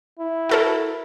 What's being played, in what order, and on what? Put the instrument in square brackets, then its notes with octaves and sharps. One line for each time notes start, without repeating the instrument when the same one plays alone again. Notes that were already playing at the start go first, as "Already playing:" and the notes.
[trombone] E4
[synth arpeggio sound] F#4 A4 A#4